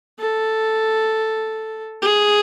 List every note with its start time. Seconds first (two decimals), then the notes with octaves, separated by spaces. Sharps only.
0.19 A4
2.02 G#4